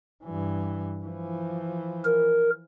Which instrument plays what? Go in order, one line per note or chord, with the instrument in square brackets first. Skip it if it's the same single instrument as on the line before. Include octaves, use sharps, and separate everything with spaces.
[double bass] G2 E3
E3 F3
[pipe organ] A#4